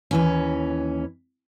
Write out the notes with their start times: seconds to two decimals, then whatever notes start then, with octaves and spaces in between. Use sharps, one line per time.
0.11 D#2 E3 C#4